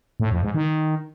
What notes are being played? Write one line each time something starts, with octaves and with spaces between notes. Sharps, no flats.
A2
F2
G#2
D#3